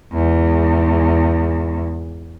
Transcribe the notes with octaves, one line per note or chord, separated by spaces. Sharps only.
E2 G#2